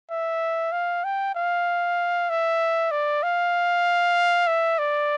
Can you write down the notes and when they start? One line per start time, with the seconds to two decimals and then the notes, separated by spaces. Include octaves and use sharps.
0.10 E5
0.72 F5
1.04 G5
1.35 F5
2.30 E5
2.91 D5
3.23 F5
4.47 E5
4.78 D5